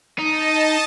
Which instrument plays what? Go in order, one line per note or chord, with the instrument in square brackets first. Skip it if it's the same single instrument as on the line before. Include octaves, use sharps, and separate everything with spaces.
[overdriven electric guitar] D#4 [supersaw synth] D#5 A5